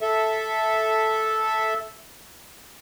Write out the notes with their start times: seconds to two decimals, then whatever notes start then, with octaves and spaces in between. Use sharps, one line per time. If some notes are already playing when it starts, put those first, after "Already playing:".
0.01 A4 E5